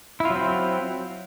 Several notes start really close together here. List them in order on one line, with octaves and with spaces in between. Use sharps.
E4 F4 F#3 C4